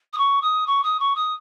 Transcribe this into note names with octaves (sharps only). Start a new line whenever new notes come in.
D#6
C#6
D#6
C#6
D#6
C#6
D#6